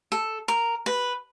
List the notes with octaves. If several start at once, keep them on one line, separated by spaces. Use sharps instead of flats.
A4
A#4
B4